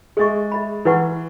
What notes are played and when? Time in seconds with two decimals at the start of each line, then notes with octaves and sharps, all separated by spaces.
0.17 G#3 G#4 E5 C#6
0.52 G#4 E5 B5
0.85 E3 E4 B4 F#5 C#6